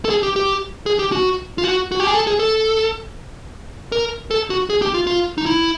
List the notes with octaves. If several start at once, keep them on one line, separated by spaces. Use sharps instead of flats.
A4
G#4
G4
G4
G#4
G4
F#4
F4
F#4
F#4
G4
G#4
A4
G#4
A4
A#4
A4
F#4
G#4
G4
F4
F4
D#4
E4